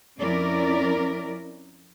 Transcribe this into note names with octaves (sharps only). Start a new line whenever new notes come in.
F2 C#4 E4 A#4 D5